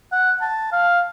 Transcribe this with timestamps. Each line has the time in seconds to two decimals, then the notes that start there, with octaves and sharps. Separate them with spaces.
0.12 F#5
0.42 A5
0.72 F5